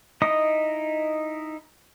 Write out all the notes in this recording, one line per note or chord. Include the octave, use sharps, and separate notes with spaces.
D#4 E4 D#5 D#6